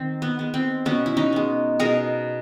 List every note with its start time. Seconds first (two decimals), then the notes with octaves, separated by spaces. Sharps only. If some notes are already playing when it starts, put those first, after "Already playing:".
Already playing: D#3 C4
0.22 B3
0.39 G#3 B3
0.54 C4
0.85 B2 B3 C#4
1.06 E4
1.17 C#4 D#4
1.33 G#3 B3
1.79 B2 G#4 A#4